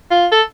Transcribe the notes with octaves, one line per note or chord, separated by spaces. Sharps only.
F4
A4